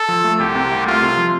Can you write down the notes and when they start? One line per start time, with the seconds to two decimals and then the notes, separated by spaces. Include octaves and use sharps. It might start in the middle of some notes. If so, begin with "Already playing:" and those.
Already playing: A4
0.08 F3
0.24 A3
0.39 C2 G4
0.55 C3
0.71 C2
0.86 A3 F4
1.02 C3
1.17 F3